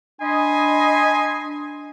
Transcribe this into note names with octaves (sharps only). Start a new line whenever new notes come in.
D4 D#5 G#5 B5 C6